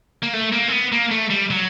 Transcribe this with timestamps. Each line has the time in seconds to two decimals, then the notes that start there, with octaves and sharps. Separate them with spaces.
0.23 A#3
0.33 A3
0.52 A#3
0.68 C4
0.72 B3
0.92 A#3
1.11 A3
1.30 G3
1.50 F#3